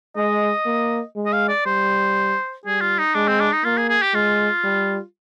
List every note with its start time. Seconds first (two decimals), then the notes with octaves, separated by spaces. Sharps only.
0.16 G#3 D#5
0.66 A#3
1.16 G#3
1.26 D#5
1.33 F5
1.49 D5
1.66 G3 C5
2.66 G3 G#4
2.81 F4
2.98 D#4
3.15 G#3 D4
3.28 C4
3.40 D4
3.53 D#4
3.64 A#3 F4
3.78 G#4
3.89 G#4
4.02 G4
4.14 G#3 F4
4.64 G3